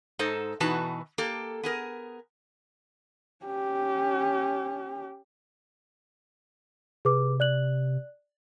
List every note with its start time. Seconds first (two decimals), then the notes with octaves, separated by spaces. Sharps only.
0.19 G#2 D#4 A4 C5
0.60 B2 E3 D#4 F#4 B4 A5
1.18 A#3 G4 A4
1.63 B3 G#4 A#4
3.46 C#4 G4
7.05 C3 G#4 B4 D6
7.40 D5 F#6 F#7